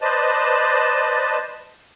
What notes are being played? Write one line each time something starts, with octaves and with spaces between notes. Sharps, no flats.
B4 C5 D5 D#5 A5